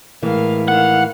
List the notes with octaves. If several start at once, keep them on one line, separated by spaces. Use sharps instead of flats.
A2 E3 G#3 A#4 F5
D#3 F5 F#5